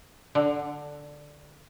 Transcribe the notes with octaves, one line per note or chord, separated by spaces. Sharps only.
D3